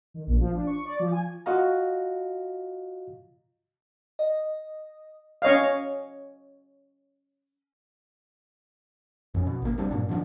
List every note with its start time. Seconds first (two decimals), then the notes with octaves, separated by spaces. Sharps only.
0.14 D#3
0.27 A#1
0.40 F3
0.52 D4
0.67 C#6
0.85 D5
1.00 F3
1.12 G#5
1.46 F4 F#4 D#5 F5 A#5
4.19 D#5
5.42 C#4 C#5 D#5 F5
9.34 F2 C#4
9.47 B2
9.62 G#1 A#3
9.78 D1 G3 C4 D4
9.91 G2 A#2 D4
10.09 D3 D#3 F3 D4